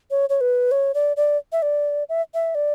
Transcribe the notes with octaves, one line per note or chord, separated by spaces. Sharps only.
C#5
C#5
B4
C#5
D5
D5
E5
D5
E5
E5
D5